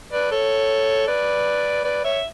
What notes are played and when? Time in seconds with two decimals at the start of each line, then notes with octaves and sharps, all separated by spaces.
0.13 B4 D5
0.31 A4 C#5
1.08 B4 D5
1.84 B4 D5
2.04 C#5 E5